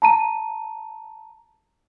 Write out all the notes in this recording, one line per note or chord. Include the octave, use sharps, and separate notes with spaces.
A5 A#5 D#7